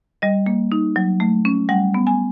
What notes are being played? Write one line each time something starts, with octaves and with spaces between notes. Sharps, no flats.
G3 D#5
A#3
D#4
F#3
A3
C#4
G3 F#5
B3
G#5